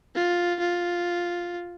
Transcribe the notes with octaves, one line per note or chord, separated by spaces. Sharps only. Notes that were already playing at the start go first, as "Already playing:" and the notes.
F4
F4